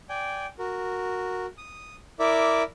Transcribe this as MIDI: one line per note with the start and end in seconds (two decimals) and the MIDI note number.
0.09 0.46 74
0.09 0.46 79
0.09 0.46 80
0.59 1.46 66
0.59 1.46 70
1.58 1.96 87
2.19 2.63 64
2.19 2.63 70
2.19 2.63 74
2.19 2.63 76
2.19 2.63 86